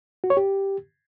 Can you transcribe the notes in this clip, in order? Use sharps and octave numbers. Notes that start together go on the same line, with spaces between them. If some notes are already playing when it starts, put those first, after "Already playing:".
F#4
C#5
G4